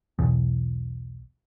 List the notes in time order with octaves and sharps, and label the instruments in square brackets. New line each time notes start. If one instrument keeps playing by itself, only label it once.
[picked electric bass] B1 E2